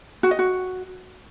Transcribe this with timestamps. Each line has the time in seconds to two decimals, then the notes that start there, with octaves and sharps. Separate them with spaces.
0.23 F#4
0.31 D#5
0.39 F#4